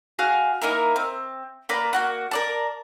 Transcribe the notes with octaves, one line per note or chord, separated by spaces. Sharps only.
F#4 G#4 F5
A#3 D#4 E4 A#4
C4
A#3 B4 D5 A#5
A#3 F#4 F#5
A#4 D5 A5